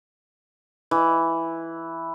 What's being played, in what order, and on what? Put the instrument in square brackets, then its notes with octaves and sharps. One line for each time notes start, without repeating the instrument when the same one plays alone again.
[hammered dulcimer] E3